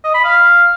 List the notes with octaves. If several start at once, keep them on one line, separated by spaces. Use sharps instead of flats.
D#5
B5
F5